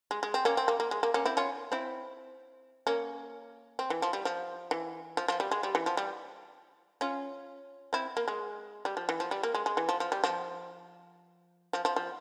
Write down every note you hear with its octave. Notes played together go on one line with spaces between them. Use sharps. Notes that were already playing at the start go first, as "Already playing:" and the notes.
G#3
G#3
C4
A#3 C#4
C4
A#3
A#3
G#3
A#3
A#3 C#4
C4 E4
C#4 F4
C4 E4
A#3 C#4
C4
E3
F3
G3
F3
E3
F3
F3
G3
G#3
G3
E3
F3
G3
C#4 F4
C4 E4
A#3
G#3
G3
F3
E3
F3
G3
A#3
G#3
G#3
E3
F3
F3
G3
F3
F3
F3
F3